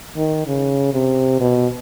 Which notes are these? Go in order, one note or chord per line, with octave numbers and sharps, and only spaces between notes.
D#3
C#3
C3
B2